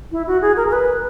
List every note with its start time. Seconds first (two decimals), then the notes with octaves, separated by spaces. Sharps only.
0.12 E4
0.27 F#4
0.42 G#4
0.57 A#4
0.68 A#4
0.73 B4